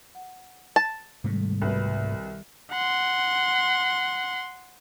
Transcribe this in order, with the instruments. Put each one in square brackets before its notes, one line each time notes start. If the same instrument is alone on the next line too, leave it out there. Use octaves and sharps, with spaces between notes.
[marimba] F#5
[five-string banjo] A5
[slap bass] G#2 C3 A3 [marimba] D#3 G3
[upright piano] C2 B2 B4
[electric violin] F#5 C6